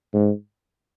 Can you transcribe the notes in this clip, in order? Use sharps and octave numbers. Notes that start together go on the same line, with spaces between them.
G#2